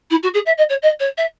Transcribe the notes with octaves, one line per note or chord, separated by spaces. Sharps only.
E4
F#4
G#4
E5
D#5
C#5
D#5
C#5
E5